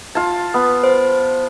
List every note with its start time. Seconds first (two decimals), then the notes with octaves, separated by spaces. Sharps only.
0.15 F4 A5
0.54 B3
0.84 C5